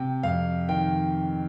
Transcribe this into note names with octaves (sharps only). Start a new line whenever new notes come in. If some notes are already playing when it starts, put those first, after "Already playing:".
Already playing: C3 G5
F2 F5
D#3 G5